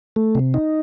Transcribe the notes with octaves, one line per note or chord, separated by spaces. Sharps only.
A3
C3
D#4